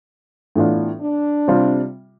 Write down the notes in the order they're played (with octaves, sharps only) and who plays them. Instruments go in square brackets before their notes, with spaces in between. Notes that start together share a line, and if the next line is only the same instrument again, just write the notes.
[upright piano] A2 E3 B3 D4 F4
[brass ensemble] D4
[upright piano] C3 G3 C4 F4